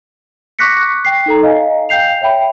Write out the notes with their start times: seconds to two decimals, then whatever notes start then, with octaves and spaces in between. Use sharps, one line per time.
0.59 C#6 D6 F#6 A#6 B6 C#7
1.05 G5 C7
1.26 D#4 A4 A#5
1.43 D#5 F5 G#5
1.89 F5 G5 G6 C7 F7
2.21 C#5 E5 G5 B5